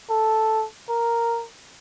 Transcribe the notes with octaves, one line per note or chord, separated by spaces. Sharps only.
A4
A#4